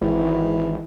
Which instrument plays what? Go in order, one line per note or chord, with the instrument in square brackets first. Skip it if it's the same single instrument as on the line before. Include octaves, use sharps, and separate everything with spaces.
[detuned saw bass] G#1 [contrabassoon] E3